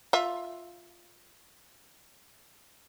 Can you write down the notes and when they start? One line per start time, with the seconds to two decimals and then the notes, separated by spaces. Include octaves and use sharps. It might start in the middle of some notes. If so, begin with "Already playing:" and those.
0.13 F4 E5